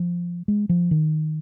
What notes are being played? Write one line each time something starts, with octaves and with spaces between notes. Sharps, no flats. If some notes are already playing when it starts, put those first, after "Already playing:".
Already playing: F3
G#3
F3
D#3